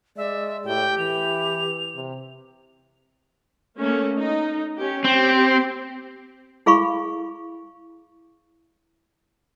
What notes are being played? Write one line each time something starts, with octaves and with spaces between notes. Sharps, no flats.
G#3 D5 E5
A2 G4 G5
E3 F7
C3
A3 A#3 C#4
D#4
C#4 G4
C4 G4
E4 G#4 F5 B5 C#6